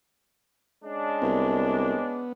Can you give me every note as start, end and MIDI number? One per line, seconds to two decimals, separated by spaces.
0.84 2.32 56
0.84 2.32 61
0.84 2.32 62
1.22 1.95 36
1.22 2.33 59